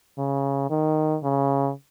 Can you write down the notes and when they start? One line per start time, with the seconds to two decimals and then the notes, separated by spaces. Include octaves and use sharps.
0.18 C#3
0.70 D#3
1.23 C#3